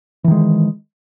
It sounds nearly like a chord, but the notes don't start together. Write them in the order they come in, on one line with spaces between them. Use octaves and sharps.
E3 D#3 G#3